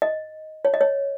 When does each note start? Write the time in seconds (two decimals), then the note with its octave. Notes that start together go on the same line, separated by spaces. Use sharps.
0.02 D#5
0.65 C#5
0.74 D#5
0.81 C#5